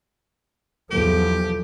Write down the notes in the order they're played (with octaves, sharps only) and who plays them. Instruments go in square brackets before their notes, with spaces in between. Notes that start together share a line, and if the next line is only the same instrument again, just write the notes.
[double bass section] B1 E2 [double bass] F3 [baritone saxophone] G4 [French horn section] A4